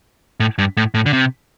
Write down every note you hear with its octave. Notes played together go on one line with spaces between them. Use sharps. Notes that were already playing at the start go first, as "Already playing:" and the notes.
A2
G2
A2
A2
D3
C3